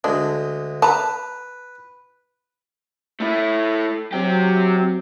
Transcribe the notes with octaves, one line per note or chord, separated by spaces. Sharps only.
D2 G#3 D4
B4 A5 A#5
A3 E4
F#3 C4 G4